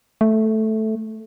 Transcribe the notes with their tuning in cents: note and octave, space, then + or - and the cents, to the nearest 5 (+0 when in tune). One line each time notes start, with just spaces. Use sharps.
A3 -5